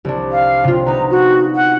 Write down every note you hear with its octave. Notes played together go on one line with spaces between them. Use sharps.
C2 D4
F5
C3 F4
B3 D#4 A#5
F#4
F#5